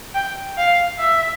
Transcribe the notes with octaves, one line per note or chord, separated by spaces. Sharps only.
G5
F5
E5